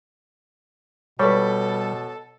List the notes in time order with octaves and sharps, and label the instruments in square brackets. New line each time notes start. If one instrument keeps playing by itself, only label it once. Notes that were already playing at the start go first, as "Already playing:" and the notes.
[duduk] B2 [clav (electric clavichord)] G3 [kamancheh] A4 [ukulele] B4 C#5